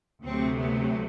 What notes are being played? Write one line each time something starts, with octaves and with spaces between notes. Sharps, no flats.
D2 C3 F#3 A3 C4
B3